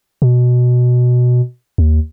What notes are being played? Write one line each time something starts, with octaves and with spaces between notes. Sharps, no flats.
B2
D#2